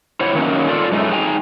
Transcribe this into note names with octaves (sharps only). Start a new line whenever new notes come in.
E4 C5 C#5 F#5
D#3 F#3 A#3 C4 C#4 D#4
F4 A4 D5
F#2 G#3 A3 D#4
D#4 G#4 G5 G#5 A#5